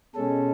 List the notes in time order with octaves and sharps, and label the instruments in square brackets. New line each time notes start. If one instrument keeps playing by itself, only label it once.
[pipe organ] B2 G#3 C#4 A4